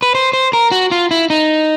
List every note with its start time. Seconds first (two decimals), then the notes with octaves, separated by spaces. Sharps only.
0.02 B4
0.15 C5
0.33 C5
0.53 A#4
0.71 F#4
0.91 F4
1.11 E4
1.30 D#4